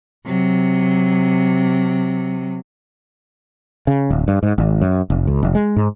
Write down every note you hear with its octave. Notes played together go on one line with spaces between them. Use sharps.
C3 F#3
C#3
D1
G2
G#2
G#1
F#2
F1
C#2
F1
G#3
G#2